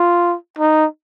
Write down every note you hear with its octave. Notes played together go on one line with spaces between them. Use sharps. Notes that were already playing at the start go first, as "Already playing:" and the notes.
Already playing: F4
D#4